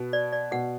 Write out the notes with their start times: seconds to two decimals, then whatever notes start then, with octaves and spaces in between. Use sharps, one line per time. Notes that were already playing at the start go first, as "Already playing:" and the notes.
Already playing: B2
0.13 D5
0.33 D5
0.51 B2 F#5